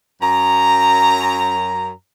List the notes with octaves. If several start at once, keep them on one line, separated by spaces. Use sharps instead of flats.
F#2 A#5